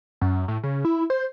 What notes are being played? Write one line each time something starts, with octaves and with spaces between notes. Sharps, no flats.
F#2
A2
C#3
E4
C5